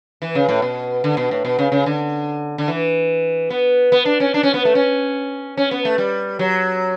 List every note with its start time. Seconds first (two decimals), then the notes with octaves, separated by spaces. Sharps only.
0.22 E3
0.35 C#3
0.48 A2
0.62 B2
1.04 D3
1.17 B2
1.31 A2
1.45 B2
1.59 C#3
1.72 C#3
1.86 D3
2.58 D3
2.68 E3
3.50 B3
3.92 B3
4.05 D4
4.20 C#4
4.34 D4
4.43 C#4
4.54 B3
4.65 A3
4.75 C#4
5.57 C#4
5.71 B3
5.85 A3
5.98 G3
6.39 F#3